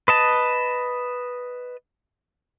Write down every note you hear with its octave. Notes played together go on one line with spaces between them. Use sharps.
B4 D#5 A5